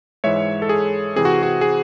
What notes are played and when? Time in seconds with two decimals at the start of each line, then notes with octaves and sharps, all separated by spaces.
0.24 G#2 E3 G#3 C#5 E5
0.62 A4
0.69 G#4
1.16 C3 E3 C4 G#4
1.25 F#4
1.43 F#4
1.61 G#4